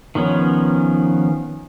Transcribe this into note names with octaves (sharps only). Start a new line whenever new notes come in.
D#3 F3 B3 C#4